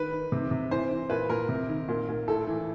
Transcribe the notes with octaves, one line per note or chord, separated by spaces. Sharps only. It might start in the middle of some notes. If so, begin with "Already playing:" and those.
Already playing: D#3 B4
D#3
C3
C3
E3 C5
E3
A#2 B4
A#2 A#4
C3
D#3
A#2
A#2
A2 A4
E3